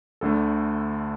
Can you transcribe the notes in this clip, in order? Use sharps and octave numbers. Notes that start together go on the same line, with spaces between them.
D2 D3 A3 A4